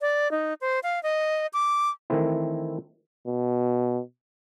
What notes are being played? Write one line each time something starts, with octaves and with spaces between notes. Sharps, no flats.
D5
D#4
C5
F5
D#5
D6
D#3 E3 A3 C4 E4
B2